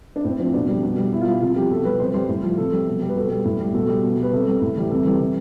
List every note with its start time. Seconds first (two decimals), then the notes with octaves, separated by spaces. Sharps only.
0.16 D4
0.24 A2 C4
0.40 F3 C4
0.54 B2 D4
0.69 G3
0.83 B2
0.98 G3
1.13 B2 E4
1.21 F4
1.27 G3 E4
1.41 C3 F4
1.56 F3 G4
1.71 B2 A4
1.85 G3 B4
1.99 C3 C5
2.14 G3 C5
2.28 A2
2.43 F3
2.57 C3 A4
2.72 G3
2.87 B2
3.02 G3
3.09 B4
3.16 B2 A4
3.30 G3
3.45 A2
3.59 G3
3.74 B2 A4
3.88 G3
4.03 B2
4.18 G3 B4
4.32 C3 A4
4.47 G3
4.61 A2
4.76 E3 G3
4.91 C3 A4
5.05 E3 G3
5.20 C3